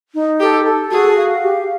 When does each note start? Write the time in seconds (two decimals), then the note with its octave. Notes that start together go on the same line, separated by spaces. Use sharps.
0.14 D#4
0.40 G4 A4
0.65 A4
0.90 F#4 G#4
1.16 F5
1.41 G4